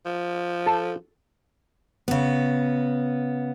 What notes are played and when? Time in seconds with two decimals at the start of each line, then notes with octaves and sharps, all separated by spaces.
0.05 F3
0.66 A4
2.08 C#3 B3